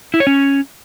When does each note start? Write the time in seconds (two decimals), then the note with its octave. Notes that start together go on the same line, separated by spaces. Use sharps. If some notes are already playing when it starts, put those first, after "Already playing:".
0.14 E4
0.20 C#5
0.27 C#4